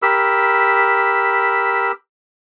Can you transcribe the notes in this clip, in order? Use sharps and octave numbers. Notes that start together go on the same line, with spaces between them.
G4 A#4 B5 E6